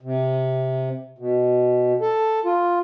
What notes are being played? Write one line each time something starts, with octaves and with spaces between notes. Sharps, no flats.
C3
B2
A4
F4